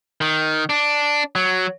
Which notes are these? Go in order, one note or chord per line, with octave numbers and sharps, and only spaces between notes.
D#3
D4
F#3